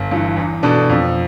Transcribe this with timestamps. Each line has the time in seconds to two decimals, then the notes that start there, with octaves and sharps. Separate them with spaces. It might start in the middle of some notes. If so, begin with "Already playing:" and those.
Already playing: G1
0.11 G2 E3
0.36 E2
0.63 B2 B3 D4 A4
0.90 F2